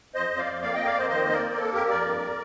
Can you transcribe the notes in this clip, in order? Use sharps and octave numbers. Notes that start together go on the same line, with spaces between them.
F2 C5 D#5
F2
D5 F5
F2
A#3 D5 F5
A#3 D#5 G5
D5 F5
F2 C5 D#5
D#3 C5 D#5
A#3
A#4 D5
A#3
A#3 A4
F2 G4 A#4
F2 A#4 D5
G2